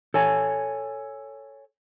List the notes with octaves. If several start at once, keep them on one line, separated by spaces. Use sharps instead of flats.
A4 C#5 G#5